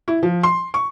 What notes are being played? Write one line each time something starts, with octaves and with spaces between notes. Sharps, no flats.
E4
F3
C6
C#6